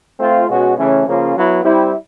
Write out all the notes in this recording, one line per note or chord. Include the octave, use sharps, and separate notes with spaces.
A3 C4 F4
B2 G#3 C#4 F#4
C#3 E3 A3 C#4
C#3 F3 A#3 C#4 F4
F#3 B3 E4
G3 C4 E4